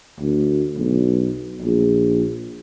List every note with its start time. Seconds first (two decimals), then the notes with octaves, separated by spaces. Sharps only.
0.20 D2
0.78 B1
1.62 A#1